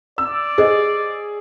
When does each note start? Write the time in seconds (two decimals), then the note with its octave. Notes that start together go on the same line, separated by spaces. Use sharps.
0.18 D5 E6
0.58 G#4 C5 D#5